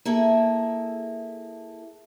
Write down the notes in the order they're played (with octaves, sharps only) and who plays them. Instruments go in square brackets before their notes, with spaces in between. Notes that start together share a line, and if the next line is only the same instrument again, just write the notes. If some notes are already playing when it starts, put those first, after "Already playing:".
[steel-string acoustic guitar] A#3 E4 G#4 A4